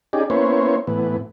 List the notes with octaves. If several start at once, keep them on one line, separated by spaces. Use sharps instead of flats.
C#4 D#4 G4 G#4 D5
A#3 B3 C#4 E4 C5 C#5
A2 E3 B3